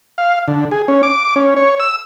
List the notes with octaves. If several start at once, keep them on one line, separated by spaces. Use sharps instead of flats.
F5
D3
G#4
C#4
D6
C#4
C#5
E6